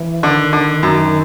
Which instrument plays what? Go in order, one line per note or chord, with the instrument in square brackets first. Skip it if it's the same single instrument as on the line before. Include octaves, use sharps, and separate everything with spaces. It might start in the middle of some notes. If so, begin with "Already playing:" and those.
Already playing: [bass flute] E3
[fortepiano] D3 [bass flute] D#3
[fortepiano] D3
F#2